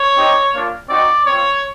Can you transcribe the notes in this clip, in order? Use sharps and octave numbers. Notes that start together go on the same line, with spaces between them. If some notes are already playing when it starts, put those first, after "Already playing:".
Already playing: C#5
C4 D#4 G4
A#3 D4 F4
C4 D#4 F#4 D5
C4 F4 C#5